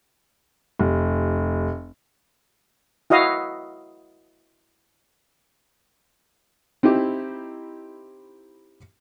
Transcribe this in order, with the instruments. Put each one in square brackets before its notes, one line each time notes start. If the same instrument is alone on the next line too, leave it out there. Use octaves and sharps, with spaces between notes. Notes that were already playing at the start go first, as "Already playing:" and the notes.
[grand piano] F1
[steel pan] E4 F#4 D#5 F5
[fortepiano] C4 D#4 E4 G4